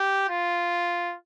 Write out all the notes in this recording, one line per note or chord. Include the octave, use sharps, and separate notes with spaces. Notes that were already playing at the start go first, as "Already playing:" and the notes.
Already playing: G4
F4